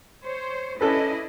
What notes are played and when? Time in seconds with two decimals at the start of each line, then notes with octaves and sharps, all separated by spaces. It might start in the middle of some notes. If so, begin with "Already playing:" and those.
0.24 C5 C#5
0.81 C#4 D4 E4 A4 B4 D#5